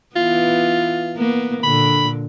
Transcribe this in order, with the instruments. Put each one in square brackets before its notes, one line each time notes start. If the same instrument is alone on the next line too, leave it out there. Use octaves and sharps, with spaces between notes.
[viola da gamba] E3 B3 [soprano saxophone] F4
[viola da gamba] A#3 B3
[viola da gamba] A#2 D3 [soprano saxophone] B5